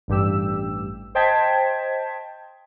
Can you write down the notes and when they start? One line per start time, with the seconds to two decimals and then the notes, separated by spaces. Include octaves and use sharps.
0.08 A1 G2 G4 E6
1.15 C5 D#5 G5 A5 G#6 B6